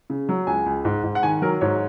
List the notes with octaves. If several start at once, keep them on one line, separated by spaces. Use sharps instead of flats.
C#3
F#3
C#2 G#5
C#2
G#2
G#2
F#5
D#3 G#5
F#3 A#4
G#2 C#5